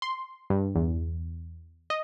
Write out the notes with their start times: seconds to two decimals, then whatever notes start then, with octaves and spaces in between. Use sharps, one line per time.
0.02 C6
0.50 G2
0.75 E2
1.90 D#5